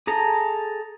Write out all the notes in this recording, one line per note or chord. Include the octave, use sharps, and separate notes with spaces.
G#4 A4 A#5